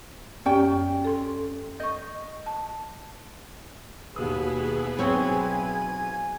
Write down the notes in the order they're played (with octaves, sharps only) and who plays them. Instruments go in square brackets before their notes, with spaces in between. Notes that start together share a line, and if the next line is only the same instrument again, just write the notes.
[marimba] F#2 G4 D5 [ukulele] C#4 G5
[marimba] A4 C6
[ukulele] D#5 [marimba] C#6 G6
[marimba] A5
[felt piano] D#2 B2 D#6 [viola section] B3 E4 G#4
[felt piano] B1 [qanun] C4 C#5 [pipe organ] G#5 G#6